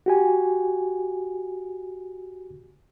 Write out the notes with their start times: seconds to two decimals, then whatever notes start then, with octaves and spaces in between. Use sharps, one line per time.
0.06 F#4 G4 G#5